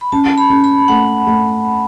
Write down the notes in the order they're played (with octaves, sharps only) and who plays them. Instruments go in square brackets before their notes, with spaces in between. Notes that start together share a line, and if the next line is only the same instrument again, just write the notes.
[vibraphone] B5
[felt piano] C#4 [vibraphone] A5
[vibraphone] B5
[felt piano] C#4
[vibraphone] B5
[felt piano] A3 [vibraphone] F#5
[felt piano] A3